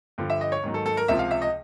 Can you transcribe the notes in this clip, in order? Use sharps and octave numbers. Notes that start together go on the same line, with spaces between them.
G2 D3 F3
E5
D#5
C#5
G#2 D#3 F#3
A4
A4
A#4
C#2 C3 F3 E5
F5
E5
D#5